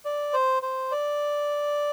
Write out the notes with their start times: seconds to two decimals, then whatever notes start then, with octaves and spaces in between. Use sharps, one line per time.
0.05 D5
0.33 C5
0.63 C5
0.92 D5